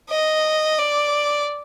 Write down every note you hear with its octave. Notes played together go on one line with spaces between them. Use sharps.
D#5
D5